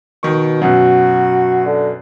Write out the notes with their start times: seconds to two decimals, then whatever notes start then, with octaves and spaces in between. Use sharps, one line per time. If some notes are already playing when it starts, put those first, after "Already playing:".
0.23 B2 D#3 C#6
0.62 F#2 B2 F#4
1.65 D3